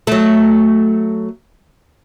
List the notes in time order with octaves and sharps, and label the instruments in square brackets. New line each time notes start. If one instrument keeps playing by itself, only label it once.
[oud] F#3 A3